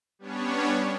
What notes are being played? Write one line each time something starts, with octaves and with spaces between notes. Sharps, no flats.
G3 B3 C#4 D4 C#5